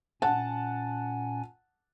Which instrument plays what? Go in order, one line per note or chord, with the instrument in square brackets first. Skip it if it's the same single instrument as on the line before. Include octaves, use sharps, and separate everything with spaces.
[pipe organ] A#2 C#4 G#5 [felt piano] F#5 A5